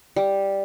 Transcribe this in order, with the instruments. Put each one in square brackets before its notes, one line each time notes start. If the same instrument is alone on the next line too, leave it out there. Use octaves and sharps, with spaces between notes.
[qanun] G3